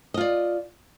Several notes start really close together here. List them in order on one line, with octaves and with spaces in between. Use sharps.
D#5 F4 D5